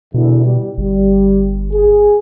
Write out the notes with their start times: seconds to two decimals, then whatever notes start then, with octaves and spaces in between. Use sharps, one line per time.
0.14 E2 B2 D3 E4
0.44 G3
0.78 G1 G3
1.74 G#4